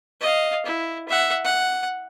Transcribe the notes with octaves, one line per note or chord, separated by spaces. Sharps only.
D#5 F5
E4
E5 F#5
F#5